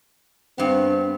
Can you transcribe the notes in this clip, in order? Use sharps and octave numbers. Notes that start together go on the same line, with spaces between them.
G2 B3 C4